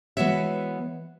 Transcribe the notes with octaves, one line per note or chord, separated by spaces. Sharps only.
E3 G#3 B3 F#4 C#5 E5